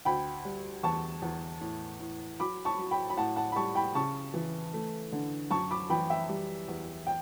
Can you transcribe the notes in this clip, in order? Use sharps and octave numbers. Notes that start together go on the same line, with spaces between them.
D2 G5 B5
G3
E2 A5 C#6
E2
A2
A2
F#3 B5 D6
A5 C#6
F#3
G5 B5
B5
A2 F#5 A5
F#5 A5
B5
G3 A5 C#6
G5 B5
C#3 A5 C#6
E3
A3
D3
F#2 A5 C#6
B5 D6
E3 G5 B5
E5 G5
G3
E2
G5